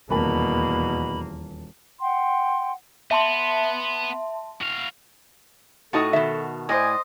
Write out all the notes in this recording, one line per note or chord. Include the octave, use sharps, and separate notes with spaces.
D#1 E2 B2 A#3 A#4 A5 B5
F#5 G5 C6
B3 E5 A5 C6
F#4 F5
A2 D#4 F#4 A4 D#5 A5 C#6
B2 D#3 E5
A2 C5 D5 D#5 G#5